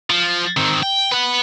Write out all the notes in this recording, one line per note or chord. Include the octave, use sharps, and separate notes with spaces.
F3
D#3 C4
G5
B4 F#5